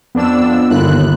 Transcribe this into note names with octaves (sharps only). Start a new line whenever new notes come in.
F2 B3 D4 E6
G1 D#2 F#6